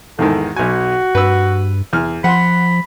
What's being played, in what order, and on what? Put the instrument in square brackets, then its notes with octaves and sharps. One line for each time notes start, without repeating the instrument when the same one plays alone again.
[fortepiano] E2 G#2 D#3 [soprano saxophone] A4
[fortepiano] B1 G#5 [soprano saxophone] F#4
[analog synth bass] G2 [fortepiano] B4 E6
[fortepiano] E2 F6
[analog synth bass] F3 [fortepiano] F#5 C6 [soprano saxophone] B5